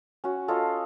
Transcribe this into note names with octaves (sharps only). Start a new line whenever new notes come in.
C#4 F#4
F4 A4 C#5 D#5